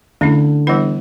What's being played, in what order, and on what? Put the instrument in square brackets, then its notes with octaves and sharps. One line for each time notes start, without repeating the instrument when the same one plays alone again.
[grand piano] D3 [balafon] A3 C#4 E4
[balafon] E3 G3 B3 E4 B4